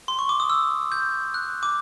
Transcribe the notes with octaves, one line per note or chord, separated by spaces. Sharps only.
C6
C#6
D6
D#6
E6
G6
F#6
D6